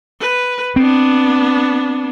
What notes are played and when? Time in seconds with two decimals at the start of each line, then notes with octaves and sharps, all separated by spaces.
0.20 B4
0.76 B3 C4 D4